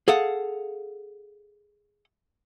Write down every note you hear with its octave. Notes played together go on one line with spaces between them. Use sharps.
G#4 A4 F5 F#5